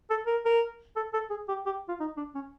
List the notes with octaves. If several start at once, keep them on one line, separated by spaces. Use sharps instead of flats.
A4
A#4
A#4
A4
A4
G#4
G4
G4
F4
D#4
D4
C#4